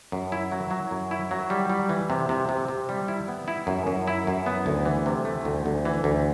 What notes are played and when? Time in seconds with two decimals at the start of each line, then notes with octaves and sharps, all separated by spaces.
0.12 F#2
0.32 E4
0.52 F#3
0.71 F#3
0.91 F#2
1.11 E4
1.31 F#3
1.50 G3
1.69 G3
1.89 E3
2.10 C3
2.29 C3
2.49 C3
2.68 C3
2.89 G3
3.08 E4
3.28 B3
3.48 E4
3.67 F#2
3.87 F#2
4.07 E4
4.27 F#2
4.46 B3
4.66 D2
4.86 E3
5.06 C3
5.25 A3
5.45 D2
5.66 D2
5.85 E3
6.04 D2